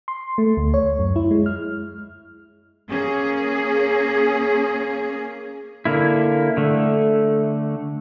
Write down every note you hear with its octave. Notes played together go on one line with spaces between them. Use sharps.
C6
A3
D2
C#5
F#2
E4
G#3
F6
A#3 C#4 G#4
D3 A#3 E4
D3 A3